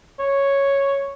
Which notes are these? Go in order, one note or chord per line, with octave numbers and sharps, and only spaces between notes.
C#5